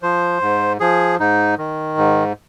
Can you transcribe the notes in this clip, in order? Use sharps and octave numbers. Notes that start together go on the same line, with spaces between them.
F3 C5
G#2
F3 G#4
G#2 D#4
D#3
G#2